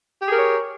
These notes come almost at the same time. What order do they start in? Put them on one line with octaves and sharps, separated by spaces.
G4 G#4 A#4 C#5